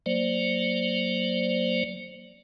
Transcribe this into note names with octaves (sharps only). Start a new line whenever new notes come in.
F#3 A#3 C5 D5